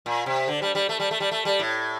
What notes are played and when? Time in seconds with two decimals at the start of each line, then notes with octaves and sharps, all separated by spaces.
0.06 A#2
0.26 C3
0.47 D3
0.62 G3
0.75 G3
0.89 A3
1.00 G3
1.11 A3
1.20 G3
1.31 A3
1.45 G3
1.59 A2